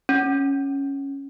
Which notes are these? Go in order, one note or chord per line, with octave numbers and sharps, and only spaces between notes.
C#4